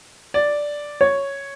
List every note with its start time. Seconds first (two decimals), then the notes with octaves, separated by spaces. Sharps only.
0.34 D5
1.01 C#5